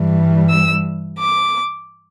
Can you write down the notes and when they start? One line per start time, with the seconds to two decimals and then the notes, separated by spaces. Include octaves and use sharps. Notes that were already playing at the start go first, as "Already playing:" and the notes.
Already playing: G2 E3 G3
0.49 E6
1.18 D6